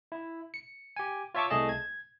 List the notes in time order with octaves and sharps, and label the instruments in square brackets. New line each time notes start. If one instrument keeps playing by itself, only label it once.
[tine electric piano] E4
C#7
G4 G#5
F4 C#5 E5 A5 C#6 D6
C2 A3 G#4 D#5 A5
G#6